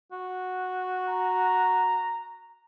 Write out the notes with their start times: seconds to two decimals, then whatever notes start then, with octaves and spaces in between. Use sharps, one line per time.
0.12 F#4
1.09 A#5